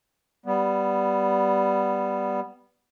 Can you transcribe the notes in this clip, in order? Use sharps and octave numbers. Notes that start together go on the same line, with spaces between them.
G3 B3